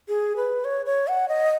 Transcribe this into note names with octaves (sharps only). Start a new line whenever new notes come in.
G#4
B4
C#5
C#5
F#5
D#5